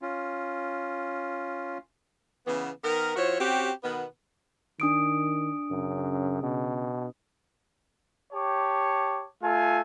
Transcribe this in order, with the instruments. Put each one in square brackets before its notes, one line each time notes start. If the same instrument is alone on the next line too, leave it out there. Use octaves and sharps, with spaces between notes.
[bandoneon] C#4 F4
[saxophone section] C#3 E3 B3
D#3 B3 A#4
F3 E4 F#4 C5 C#5
C4 C#4 F#4 G4
B2 D#3 B3
[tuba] D#3 [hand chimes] D4 D#6 D7
[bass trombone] F#2 [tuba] C#3
[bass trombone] B2
[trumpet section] G4 C#5 A5 D6
A3 F4 A4 G#5